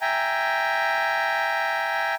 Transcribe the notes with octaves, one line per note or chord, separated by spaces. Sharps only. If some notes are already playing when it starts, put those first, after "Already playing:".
E5 G5 G#5 A#5